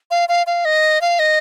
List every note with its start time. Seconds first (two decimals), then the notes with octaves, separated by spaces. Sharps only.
0.11 F5
0.29 F5
0.47 F5
0.65 D#5
1.01 F5
1.19 D#5